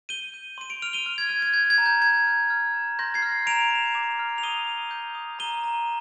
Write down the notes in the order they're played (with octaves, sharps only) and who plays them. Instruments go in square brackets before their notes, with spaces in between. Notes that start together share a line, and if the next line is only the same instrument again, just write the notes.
[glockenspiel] G6 D#7 G7
G6
C6 D#7
D7 F7
F6 D7 F7
D#7 G7
F6
G#6
F6 G#6
G#6
G6 G#6
G#6
A#5
G6
F6 G#6
F6
F6
A#5
C6 G6 A#6
G#6 C7
F6
A#5 D7 F7
A#5
D6
F6
F7
D#6 D#7 G7
D#6
G6
D#6
A#5 D#7 G7
A#5